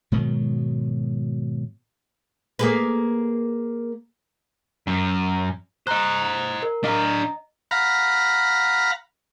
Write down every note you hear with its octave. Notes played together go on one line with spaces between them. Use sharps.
G#2 B2 D#3 F#3
A#3 G#4 B4
F#2
C5 D#5 A#5 F#6
A#4
D4 D#5 F5 A#5
F5 F#5 A#5 B5